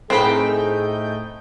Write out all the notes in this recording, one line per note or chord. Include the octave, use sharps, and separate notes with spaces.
A2 C4 D#4 G#4 B4 G5